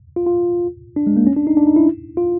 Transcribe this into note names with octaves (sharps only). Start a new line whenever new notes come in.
F4
F4
D4
G#3
A#3
C#4
D4
D#4
D4
D#4
E4
F4